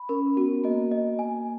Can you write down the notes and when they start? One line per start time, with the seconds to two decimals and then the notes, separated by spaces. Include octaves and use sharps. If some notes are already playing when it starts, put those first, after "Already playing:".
Already playing: B5
0.09 C#4 A#4
0.37 B3 F#4
0.64 A#3 D#5
0.91 D#5
1.19 G#5